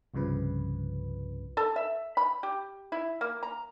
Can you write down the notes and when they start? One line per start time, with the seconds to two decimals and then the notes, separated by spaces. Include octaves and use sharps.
0.14 C2 G2 C#3 F3 B4
1.57 A4
1.76 E5
2.17 B5
2.43 G4
2.92 E4
3.21 A#3
3.43 A#5